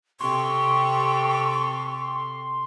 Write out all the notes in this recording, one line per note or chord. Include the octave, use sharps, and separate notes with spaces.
C3 G4 A4 C6 C#6